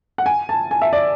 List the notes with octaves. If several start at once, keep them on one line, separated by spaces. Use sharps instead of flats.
F#5
G#5
A5
G#5
E5
D5